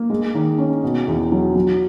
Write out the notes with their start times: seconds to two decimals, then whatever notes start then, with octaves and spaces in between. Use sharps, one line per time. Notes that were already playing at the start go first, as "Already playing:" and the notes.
Already playing: A#3
0.10 G#3
0.35 D#3
0.58 C#4
0.83 B2
1.07 E2
1.32 F#3
1.55 F#3